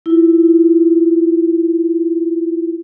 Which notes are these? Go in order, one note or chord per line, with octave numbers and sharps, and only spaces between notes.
E4 F4